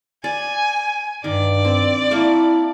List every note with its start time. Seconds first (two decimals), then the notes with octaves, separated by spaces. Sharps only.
0.24 D5 G#5
1.24 G2 D#3 D5
1.65 C4
2.11 A3 A#3 E4